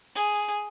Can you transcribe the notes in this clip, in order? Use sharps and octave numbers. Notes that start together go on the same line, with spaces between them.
G#4